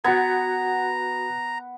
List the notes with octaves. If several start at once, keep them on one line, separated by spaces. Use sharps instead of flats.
B3 F#4 F#5 A#5 G#6